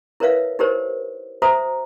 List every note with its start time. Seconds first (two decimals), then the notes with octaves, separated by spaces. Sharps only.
0.20 E4 A#4 B4 C#5 E5 F5
0.59 D#4 E4 G4 A#4 C5 C#5
1.42 F#4 C5 E5 A#5 D#6